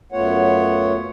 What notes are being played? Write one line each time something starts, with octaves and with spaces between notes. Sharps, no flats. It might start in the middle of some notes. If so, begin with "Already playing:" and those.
F#2 A3 B3 F4 C#5 F#5